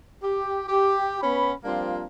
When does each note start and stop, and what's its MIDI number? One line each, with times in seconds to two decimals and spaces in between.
0.22 0.63 67
0.68 1.17 67
1.21 1.52 59
1.21 1.52 61
1.21 1.52 83
1.64 2.04 53
1.64 2.04 55
1.64 2.04 58
1.64 2.04 60
1.64 2.04 62
1.64 2.04 65